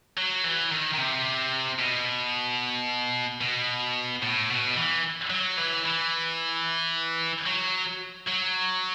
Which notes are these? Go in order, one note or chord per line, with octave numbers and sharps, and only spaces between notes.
F#3
E3
D#3
D#3
C3
B2
B2
A2
B2
E3
F#3
E3
E3
F#3
F#3